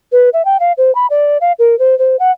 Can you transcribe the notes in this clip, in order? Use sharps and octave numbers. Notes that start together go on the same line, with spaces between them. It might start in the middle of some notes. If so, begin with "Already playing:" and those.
B4
E5
G5
F5
C5
B5
D5
F5
A#4
C5
C5
F#5